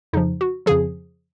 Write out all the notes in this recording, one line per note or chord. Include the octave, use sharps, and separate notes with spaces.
F2 C#3 F3 D#4
F#4
F2 C#3 F3 G#4